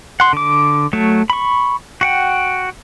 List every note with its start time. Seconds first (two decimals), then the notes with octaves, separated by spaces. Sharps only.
0.20 F#5 C6
0.33 D3 D6
0.93 F#3 A3 A5
1.30 B5 C#6
2.01 F#4 F#5 G5